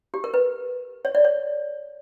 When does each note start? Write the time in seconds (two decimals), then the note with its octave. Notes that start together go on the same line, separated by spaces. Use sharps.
0.14 G4
0.24 A#4
0.34 B4
1.05 C#5
1.15 D5
1.24 C#5